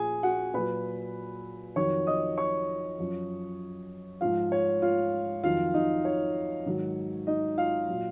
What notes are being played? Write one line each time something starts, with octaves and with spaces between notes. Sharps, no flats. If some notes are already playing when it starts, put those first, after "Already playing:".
Already playing: A#2 F3 G#4 G#5
F#4 F#5
A#2 F#3 B4 B5
F2 D#3 F#3 C#5 C#6
D#5 D#6
C#5 C#6
F#2 F3
G#2 F3 F4 F5
C#5
F4 F5
F2 D#3 F#3 F4 F5
D#4 D#5
C#5
G#2 D#3 F#3
D#4 D#5
F4 F5
A#2 F#3